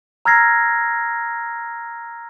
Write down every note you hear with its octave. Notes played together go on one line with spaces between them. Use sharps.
A#5 E6 F6 G#6 A#6 C7